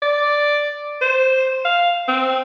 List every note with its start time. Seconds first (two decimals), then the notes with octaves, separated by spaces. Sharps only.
0.02 D5
1.01 C5
1.65 F5
2.08 C4